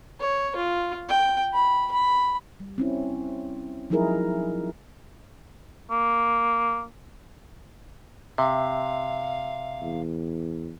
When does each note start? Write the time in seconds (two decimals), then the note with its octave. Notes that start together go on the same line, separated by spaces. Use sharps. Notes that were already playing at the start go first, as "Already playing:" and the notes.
0.20 C#5
0.56 F4
1.09 G5
1.54 B5
1.91 B5
2.60 G3
2.78 C4 C#4 E4
3.90 F3 F#3 D#4 E4 G#4 A#4
5.90 A#3
8.38 C3 E5 F5
9.82 E2